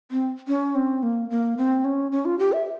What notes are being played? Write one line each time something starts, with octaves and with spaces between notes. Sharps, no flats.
C4
C#4
C4
A#3
A#3
C4
C#4
C#4
F4
G4
E5